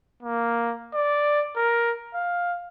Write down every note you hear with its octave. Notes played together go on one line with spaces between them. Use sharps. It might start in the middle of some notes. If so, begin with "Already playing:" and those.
A#3
D5
A#4
F5